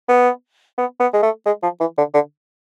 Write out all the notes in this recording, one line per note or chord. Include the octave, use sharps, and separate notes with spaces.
B3
B3
B3
G#3
A3
G#3
F3
E3
D3
D3